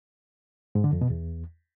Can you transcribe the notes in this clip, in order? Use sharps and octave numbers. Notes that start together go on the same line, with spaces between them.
G#2
D3
F2
B2
E2